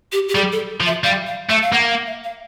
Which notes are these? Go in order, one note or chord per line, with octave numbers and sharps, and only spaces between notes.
G4
G4
G3 G#4
A4
F3
E5
G3 F5
F5
A3 E5
F5
A#3 F#5
F5
E5
F5